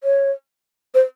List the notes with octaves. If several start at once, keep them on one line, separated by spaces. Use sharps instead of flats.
C#5
C5